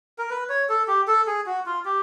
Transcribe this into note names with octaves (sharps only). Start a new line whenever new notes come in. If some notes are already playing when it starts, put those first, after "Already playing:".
A#4
B4
C#5
A4
G4
A4
G#4
F#4
F4
G4